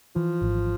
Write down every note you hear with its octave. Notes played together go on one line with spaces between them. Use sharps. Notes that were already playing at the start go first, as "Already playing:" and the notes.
E3 F3
G#1